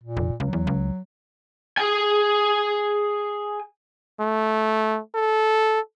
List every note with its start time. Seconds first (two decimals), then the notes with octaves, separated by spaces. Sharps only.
0.04 A#2
0.17 F1
0.40 C#2 F#3
0.53 E2
0.67 C#2
1.77 G#4 G#5
4.20 A3
5.15 A4